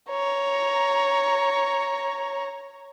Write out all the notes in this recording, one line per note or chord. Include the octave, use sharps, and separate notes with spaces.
C#5 A#5